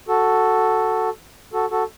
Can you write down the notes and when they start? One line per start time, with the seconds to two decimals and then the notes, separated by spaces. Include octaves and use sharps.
0.08 F#4 A4
1.53 F#4 A4
1.71 F#4 A4